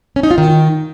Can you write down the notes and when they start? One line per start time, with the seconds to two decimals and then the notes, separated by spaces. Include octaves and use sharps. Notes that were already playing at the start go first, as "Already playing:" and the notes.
0.16 C#4
0.23 D#4
0.31 F4
0.38 D#3